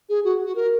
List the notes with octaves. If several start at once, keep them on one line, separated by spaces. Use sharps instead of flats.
G#4
F#4
F#4
A#4